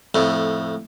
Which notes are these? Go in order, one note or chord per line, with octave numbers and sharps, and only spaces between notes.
F2 A2